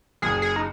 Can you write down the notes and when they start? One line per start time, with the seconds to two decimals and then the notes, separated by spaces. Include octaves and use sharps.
0.22 F#1 G#4
0.42 G#4
0.56 D#4